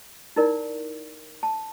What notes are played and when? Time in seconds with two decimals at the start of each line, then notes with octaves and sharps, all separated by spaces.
0.36 D#4 E4 A#4 D5
1.43 A5